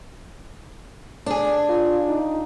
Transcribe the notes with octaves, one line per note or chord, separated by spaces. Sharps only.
D4 G#4
F4
D#4